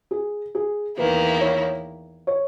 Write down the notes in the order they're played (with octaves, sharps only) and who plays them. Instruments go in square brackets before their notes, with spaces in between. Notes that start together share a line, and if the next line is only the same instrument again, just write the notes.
[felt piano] G#4
G#4
[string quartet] E2 D#3 A#3 E4 [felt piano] B4
[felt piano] C#5
C#5